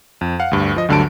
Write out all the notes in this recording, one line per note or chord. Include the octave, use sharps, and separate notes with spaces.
F2
F5 F#5
D2 G2
F3 D#5
D2 G2 D3 F#3 A5 D7